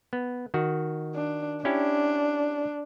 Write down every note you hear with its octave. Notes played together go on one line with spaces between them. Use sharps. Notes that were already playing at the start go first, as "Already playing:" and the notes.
B3
D#3 F#4
D4
C#4 D4 E4 G4